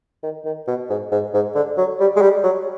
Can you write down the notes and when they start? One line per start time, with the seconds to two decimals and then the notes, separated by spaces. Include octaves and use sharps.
0.23 D#3
0.45 D#3
0.68 B2
0.89 G#2
1.12 G#2
1.33 G#2
1.55 D3
1.77 F#3
2.00 G3
2.16 G#3
2.22 G3
2.44 F#3